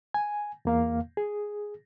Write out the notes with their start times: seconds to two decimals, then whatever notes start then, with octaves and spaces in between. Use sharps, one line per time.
0.14 G#5
0.65 E2 A#3 F5
1.17 G#4